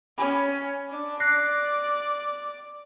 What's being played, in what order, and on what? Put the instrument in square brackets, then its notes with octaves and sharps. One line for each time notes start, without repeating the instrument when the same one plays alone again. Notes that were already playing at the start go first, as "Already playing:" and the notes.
[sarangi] C#4 [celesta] G#5 B5
[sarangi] D4
[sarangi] D5 [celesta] F#6 A#6 C7